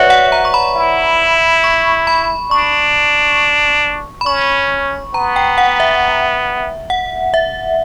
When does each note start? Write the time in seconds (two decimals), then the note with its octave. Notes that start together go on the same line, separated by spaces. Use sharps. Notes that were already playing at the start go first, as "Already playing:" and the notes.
Already playing: F#4 B4 C#5 D5 E5
0.10 F#5
0.32 A#5
0.45 C#6
0.54 B5
0.76 E4
1.64 C#6
2.07 B5
2.51 D4 C#6
4.21 B5
4.26 C#4 C#6
5.14 B3 A#5
5.36 G5
5.58 F#5
5.80 E5
6.90 F#5
7.34 E5